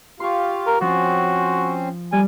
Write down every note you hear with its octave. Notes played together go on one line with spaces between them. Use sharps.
F4 G4 F5 C6 C#6
A#4
F3 C4 C#4 F#4 C5
G3 G#5